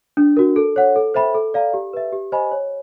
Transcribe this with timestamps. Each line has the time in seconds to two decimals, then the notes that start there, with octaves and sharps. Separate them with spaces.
0.17 D4
0.37 F#4 A#4
0.56 A4
0.76 C#5 F#5
0.96 A4
1.14 C5 E5 G5 B5
1.34 A4
1.54 D5 F5 A#5
1.74 G4
1.93 B4 E5
2.12 G4
2.32 C5 D#5 G#5 B5
2.51 C#5